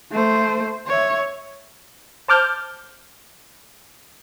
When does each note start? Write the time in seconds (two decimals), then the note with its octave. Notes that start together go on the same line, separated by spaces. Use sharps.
0.11 A3 C5
0.88 C#5 E5
2.28 C5 A5 D6 F6 G6